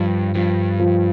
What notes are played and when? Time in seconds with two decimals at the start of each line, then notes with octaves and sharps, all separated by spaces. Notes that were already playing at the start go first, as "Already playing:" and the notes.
Already playing: G2 F3
0.35 G2 F3
0.80 F3